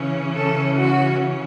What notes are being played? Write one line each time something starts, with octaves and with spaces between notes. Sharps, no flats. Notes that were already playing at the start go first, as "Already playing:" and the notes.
Already playing: C#3 E3 C#4
A4
F#4